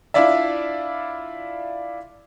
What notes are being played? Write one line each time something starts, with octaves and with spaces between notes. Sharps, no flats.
D4 E4 F4 D5 E5